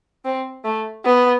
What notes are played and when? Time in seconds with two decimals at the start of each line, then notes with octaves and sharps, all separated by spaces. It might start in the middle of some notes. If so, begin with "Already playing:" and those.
0.25 C4
0.64 A3
1.05 B3